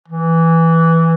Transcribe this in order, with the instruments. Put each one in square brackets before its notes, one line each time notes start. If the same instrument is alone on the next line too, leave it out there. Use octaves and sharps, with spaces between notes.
[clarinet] E3